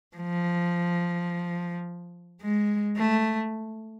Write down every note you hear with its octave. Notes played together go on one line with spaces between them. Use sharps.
F3
G#3
A3